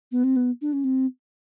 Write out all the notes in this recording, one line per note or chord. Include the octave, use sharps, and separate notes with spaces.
B3
C4
B3
D4
C#4
C4